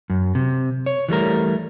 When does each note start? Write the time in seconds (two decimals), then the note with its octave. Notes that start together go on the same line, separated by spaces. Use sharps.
0.10 F#2
0.35 C3
0.86 C#5
1.09 E3 G3 A3 A#4